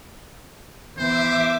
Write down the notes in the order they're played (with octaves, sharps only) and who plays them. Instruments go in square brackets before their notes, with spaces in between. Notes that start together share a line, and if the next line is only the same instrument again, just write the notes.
[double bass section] E3 B3 [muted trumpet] C5 [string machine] E5 D6